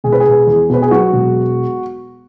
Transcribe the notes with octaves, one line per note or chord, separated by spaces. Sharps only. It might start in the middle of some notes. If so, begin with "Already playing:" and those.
E1 G#4
B4
G#4
E1
E2
B2 B4
G#4
F#3 F#4
E1